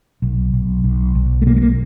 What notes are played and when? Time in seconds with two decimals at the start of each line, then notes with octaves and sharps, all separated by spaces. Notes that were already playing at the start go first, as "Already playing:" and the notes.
0.22 B1
0.53 B1
0.84 B1
1.15 B1
1.42 A3
1.47 B2 A#3
1.56 A3
1.62 A#3